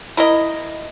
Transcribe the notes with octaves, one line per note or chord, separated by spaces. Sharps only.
E4 A#4 D#5